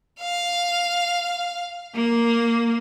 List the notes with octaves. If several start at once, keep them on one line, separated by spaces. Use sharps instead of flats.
F5
A#3